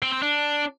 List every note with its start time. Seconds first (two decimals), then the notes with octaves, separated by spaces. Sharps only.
0.02 C4
0.12 C4
0.22 D4